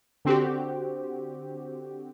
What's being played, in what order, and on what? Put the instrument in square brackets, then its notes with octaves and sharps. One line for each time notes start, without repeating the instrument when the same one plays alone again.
[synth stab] D3 C4 F#4 G4